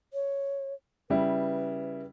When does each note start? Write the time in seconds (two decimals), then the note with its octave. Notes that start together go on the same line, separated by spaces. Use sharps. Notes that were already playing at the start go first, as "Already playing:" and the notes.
0.13 C#5
1.10 C#3 G3 E4 B4